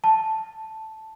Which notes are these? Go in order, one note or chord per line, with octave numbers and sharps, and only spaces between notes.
A5